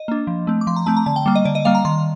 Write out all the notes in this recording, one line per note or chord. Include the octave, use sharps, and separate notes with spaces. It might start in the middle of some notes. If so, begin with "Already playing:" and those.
Already playing: D#5
A#3 D4
F3
A3 C4
D6
F3 C6
A#5
A3 C4 A5
A#5
D3 A5
G5
G3 A#3
D#5
D3 D5
D#5
G3 A#3 F5
A#5
D#3 C6